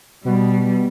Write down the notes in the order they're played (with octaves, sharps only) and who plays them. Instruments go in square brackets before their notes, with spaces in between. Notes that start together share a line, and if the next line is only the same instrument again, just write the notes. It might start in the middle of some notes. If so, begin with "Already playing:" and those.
[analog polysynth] B2 [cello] G3